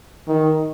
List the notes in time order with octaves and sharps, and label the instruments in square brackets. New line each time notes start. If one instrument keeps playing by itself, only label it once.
[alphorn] D#3